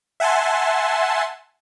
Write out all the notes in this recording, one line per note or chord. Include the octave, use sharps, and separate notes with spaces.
E5 F#5 G#5 A5 C6